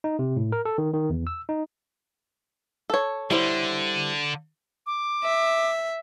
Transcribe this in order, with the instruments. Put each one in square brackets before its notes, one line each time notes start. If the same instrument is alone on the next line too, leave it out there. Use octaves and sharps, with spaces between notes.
[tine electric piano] D#4
C3
A2
A#4
A4
D#3
D#3
E2
E6
D#4
[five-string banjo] A4 C#5
[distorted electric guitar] D3 [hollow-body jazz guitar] G3 E4 C5
[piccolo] D6
[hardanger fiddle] E5